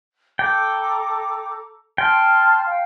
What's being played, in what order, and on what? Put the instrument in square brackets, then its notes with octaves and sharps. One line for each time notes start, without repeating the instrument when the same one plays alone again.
[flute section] A4 A#5 D6 [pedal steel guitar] G5
[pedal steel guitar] G5 [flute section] A5 C6 F6
[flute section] F5 G5